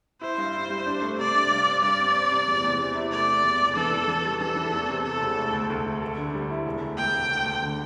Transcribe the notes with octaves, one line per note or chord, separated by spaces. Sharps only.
E4 C5
G2
E4
G3
D4
A3
C3 D5
D4
G2
C4
G2 D5
C4
C4
C3
E2
E2
C3
E4
A3 D5
C3
E2
E1
E3 A4
E2
E3
G3
E3 A4
E3
E2
C3
C3 A4
E1
A3
D2
D2
A3
A4
D3
G3
E4
E1
D2
E1 G5
E1
D2
D2
D3